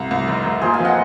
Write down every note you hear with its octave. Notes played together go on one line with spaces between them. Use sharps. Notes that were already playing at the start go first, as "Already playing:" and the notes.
Already playing: C2
C2
F1
F1
A#2 G#4 C5
F5 G#5
F3
D#5 F#5